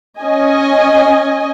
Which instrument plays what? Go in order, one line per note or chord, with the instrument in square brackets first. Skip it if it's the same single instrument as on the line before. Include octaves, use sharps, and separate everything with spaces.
[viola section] C#4 D#5 G#5